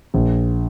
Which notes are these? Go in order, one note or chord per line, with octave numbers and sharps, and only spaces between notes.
A#1